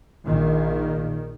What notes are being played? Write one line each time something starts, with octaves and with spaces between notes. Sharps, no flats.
A#1 A#2 D#3